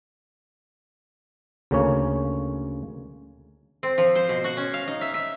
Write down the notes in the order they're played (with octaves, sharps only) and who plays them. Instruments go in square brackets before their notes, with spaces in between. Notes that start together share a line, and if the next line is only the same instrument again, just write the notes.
[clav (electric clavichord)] D2 C#3 A#3 C#4 C#5
[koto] C4
F3
C5
B2
F#4
C#4
F5
D#4
E5
E5